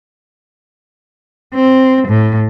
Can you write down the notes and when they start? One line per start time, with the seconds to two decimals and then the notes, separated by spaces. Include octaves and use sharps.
1.55 C4
2.08 A2